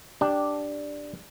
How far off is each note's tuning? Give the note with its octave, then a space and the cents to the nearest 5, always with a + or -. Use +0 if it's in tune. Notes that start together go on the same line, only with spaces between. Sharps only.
D4 +0 G4 +0